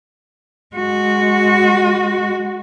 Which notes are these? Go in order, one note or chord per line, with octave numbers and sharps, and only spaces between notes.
G#3 F#4